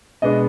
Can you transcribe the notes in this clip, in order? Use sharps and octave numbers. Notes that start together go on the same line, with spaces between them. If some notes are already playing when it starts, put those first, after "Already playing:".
B2 G#3 B3 D4 D#5